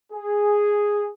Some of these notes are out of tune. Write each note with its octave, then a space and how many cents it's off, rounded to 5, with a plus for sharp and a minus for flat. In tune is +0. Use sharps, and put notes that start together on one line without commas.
G#4 -5